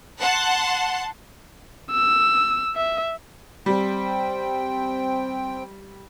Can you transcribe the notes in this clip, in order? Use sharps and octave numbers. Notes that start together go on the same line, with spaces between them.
F#5 A5 C6
E6
E5
G3 C4 G5